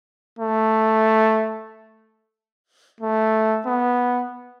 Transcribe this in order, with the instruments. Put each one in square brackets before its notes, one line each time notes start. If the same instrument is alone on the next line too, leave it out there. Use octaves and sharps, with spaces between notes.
[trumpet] A3
A3
B3